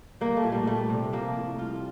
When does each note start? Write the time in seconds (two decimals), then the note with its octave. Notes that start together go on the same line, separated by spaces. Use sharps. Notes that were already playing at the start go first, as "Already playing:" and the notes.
0.21 G3 A#3
0.37 A3
0.44 A#2
0.52 G3
0.67 G3 A3
0.90 C3
1.13 F3 A#3
1.36 A2
1.58 G3 F4